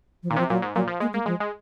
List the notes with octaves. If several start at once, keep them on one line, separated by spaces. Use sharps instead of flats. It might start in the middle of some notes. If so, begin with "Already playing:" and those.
F3
A#2 D#3
C3 F3
A#2 F#3
G#2
A#2 F#3
F3
G#3 A#3
G#3 A#3
F3 G#3
G#3